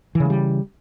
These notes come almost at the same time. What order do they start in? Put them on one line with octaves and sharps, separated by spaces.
E3 C#3 G#3 G3